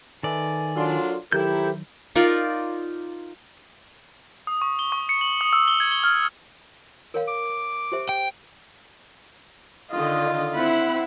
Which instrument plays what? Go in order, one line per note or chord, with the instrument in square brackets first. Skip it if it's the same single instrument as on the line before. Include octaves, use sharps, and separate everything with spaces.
[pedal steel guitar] D#3 D5 [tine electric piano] A4 B4 E5 [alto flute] G#5
[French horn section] F#3 D4 F4 [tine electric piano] A4 A#4 C6
[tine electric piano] D#3 F#3 [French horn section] E4 A4 A#4 [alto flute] G4 [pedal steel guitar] C5 G6
[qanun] D#4 F4 A#4 D5
[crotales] D#6
C#6
G7
C#6
C#7
F#7
D#6
E6
G7
G#6
G7
F6
[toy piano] A#4 C#5 F5
[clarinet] D6
[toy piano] G4 C5 E5
[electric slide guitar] G5
[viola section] D3 D#3 D#5 [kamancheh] F4
[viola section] C4 F#5 B5 [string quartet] E4